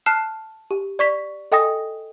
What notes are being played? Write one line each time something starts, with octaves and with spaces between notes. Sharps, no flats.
A5 F6 F#6 C7 E7
G4
D5 C#6 B6
A4 D#5 G5 G#5 D#6 A#6